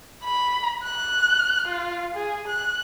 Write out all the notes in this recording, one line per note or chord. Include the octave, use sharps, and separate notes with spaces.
B5
F#6
F4
G#4
F#6